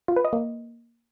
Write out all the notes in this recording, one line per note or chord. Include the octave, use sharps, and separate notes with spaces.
F4
B4
D#5
A#3